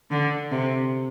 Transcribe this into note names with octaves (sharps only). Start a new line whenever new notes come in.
D3
C3